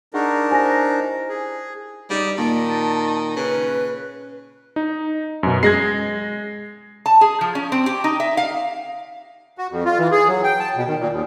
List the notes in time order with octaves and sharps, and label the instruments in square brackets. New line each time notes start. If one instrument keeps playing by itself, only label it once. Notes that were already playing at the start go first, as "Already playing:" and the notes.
[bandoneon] D4 D#4 A#4 [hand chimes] G#4 F#5 C#6
[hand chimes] E4 G4 C5 [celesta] G#5 A#6
[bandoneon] G#4
[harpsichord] C#2 [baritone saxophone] G3 [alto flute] D#4
[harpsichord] A#2 D6 [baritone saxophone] D#3 [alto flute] A5
[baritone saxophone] C#3 [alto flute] B4
[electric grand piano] D#4
F#2 B2
[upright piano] G#3 [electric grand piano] G#6 A#6 C7
[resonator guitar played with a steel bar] A5
G#4
F3
C#4
C4
G4
D#4
E5
F5
[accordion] F#4
F2
F4
E3
G#4
F#3
G5
A5
B2
D#3
A#2
D#2